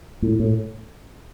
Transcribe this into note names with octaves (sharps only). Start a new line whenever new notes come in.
A2
A2